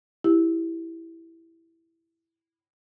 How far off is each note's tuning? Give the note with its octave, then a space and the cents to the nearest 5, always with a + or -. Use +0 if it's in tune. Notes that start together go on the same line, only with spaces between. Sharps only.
E4 +0 G4 +0